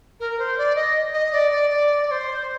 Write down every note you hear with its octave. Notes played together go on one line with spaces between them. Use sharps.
A#4
C5
D5
D#5
D#5
D5
D5
D5
D5
C5